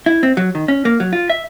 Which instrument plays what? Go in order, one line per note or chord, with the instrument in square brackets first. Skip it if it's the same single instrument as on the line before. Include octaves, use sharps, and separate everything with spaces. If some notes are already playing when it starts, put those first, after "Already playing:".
[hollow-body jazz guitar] E4
C4
F#3
D#3
C#4
A#3
F#3
F4
E5